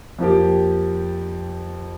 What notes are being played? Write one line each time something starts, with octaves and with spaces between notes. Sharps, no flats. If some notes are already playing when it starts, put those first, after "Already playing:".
F2 F3 A#3 G4